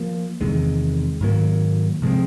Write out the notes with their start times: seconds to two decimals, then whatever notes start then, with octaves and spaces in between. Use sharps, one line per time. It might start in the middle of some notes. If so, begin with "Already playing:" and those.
Already playing: F3 A#3
0.41 E2 C3 D#3 G#3
1.21 G#2 D#3 F#3 A#3
2.02 C3 F3 G#3 C4